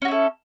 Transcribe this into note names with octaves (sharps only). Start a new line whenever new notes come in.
C#4 E4 F#4 A4